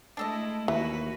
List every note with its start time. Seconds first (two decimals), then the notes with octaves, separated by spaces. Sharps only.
0.17 G#3 A3 D4 E4 A4 D#5
0.68 D#2 E3 A#3 F#4 B4